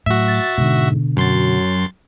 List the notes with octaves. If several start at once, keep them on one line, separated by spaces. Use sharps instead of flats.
A2 F#3 F#4 E5
A6
G#2 B2 D3
F#2 F#3 C6 A6